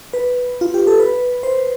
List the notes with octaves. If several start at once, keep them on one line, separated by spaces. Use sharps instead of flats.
B4
F4
G4
A4
B4
C5